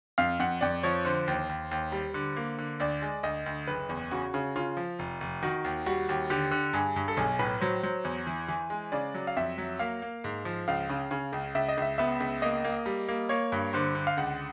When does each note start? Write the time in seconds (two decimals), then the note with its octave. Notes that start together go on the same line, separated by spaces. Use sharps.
0.18 F2 F5
0.39 F2 F#5
0.61 F2 D5
0.83 F3 C#5
1.05 D3 C5
1.27 D#2
1.49 D#2
1.71 D#2
1.92 G3
2.14 D3
2.36 A#3
2.58 D3
2.80 D2 D5
3.02 G#3
3.23 D2 D#5
3.46 D2
3.67 F#1 B4
3.89 E2
4.11 C#3 F#4
4.34 C#3
4.56 C#3 F4
4.77 F3
4.99 F1
5.21 F1
5.43 D#3 F#4
5.64 D#2
5.86 G3 F#4
6.09 D#2
6.30 D3 G4
6.51 D3
6.73 G2 G#4
6.96 G2
7.08 A4
7.17 B1 G#4
7.39 A2 B4
7.61 F#3 C5
7.83 F#3 C5
8.04 E2
8.27 E3
8.48 E3
8.70 G#3
8.92 C#3 D5
9.15 F#3
9.27 F5
9.37 F2 E5
9.58 F#3
9.79 A#3 F5
10.02 A#3
10.24 G#2
10.45 F3
10.68 C#2 F5
10.89 C#3
11.11 C#3
11.32 C#2
11.55 C#2 E5
11.68 D#5
11.77 C#2 E5
11.98 B3 E5
12.20 C#2
12.42 A#3 D#5
12.64 A#3
12.86 G3
13.09 A#3
13.29 A#3 C#5
13.52 G2
13.73 D3 C5
13.95 D3
14.07 F5
14.17 C#2 F#5